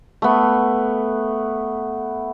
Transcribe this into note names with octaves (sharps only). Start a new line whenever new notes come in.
A3 B3